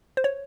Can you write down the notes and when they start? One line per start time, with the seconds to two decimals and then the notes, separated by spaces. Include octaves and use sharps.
0.17 C5
0.24 C#5